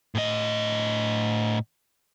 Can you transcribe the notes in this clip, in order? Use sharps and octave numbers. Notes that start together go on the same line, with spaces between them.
A2 D#5